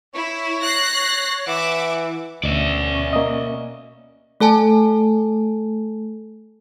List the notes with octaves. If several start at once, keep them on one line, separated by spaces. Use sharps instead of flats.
E4 C#5
F#6 A#6 C7
E3 E5 F#5 D6
D2 B2 C#4 D5 E5
A#3 D#5
A3 A4 G#5 A5